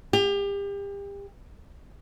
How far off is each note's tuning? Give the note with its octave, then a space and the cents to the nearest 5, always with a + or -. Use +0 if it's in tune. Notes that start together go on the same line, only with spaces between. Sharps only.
G4 +35